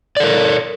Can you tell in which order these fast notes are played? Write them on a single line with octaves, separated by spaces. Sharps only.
D5 A4 A#4